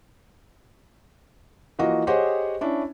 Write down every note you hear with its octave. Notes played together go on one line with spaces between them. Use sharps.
E3 F3 A#3 F#4 D#5
G4 G#4 C5 C#5 D#5 F#5
C#4 D4 E4